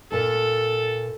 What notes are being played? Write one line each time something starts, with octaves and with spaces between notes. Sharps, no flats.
A#2 A4 A5